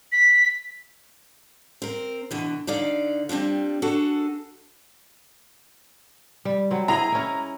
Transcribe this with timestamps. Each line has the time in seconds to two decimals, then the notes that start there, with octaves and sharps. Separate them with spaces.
0.12 B6
1.82 C4 A#4
2.31 B2 D3 E3
2.67 D3 D#4 D5 F5
3.29 G3 C4 D4 F4
3.82 D4 F#4 G#4 A4
6.45 G3
6.71 F#3 C4
6.88 E4 G#4 D#5 A#5
7.12 C#4 E4